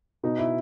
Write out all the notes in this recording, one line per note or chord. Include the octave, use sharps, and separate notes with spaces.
B2 D#4
E4